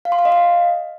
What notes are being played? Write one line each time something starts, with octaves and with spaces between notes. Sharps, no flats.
F5
C6
F5
D#5
F5